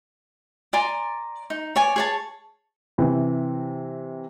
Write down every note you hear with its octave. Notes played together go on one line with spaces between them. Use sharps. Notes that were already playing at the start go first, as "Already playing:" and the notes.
D5 G#5 A#5 C6
D#4
C#5 D5 G#5
G#4 C#5 A5
C3 E3